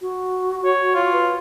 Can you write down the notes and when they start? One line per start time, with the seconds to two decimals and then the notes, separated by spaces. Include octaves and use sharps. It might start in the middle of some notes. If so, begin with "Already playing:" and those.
0.01 F#4
0.64 C#5
0.95 F4
1.12 B4